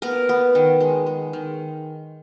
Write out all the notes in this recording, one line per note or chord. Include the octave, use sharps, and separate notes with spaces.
B3 A#4
B3
D#3
G#3
G#3
D#3